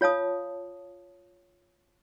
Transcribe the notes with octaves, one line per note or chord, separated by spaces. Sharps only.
F4 C#5 F5 A5 D#6